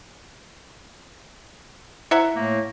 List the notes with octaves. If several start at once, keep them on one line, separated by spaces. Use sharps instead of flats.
E4 C5 E5 F#5 A#5
A2 A3 A#3